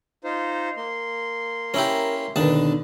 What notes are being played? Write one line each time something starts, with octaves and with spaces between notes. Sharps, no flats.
D#4 F4 C5
A#3 C6
C#4 E4 G4 A#4
D#2 B2 D3 D#3 D4 A5